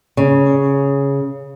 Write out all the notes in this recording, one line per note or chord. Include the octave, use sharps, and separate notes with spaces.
C#3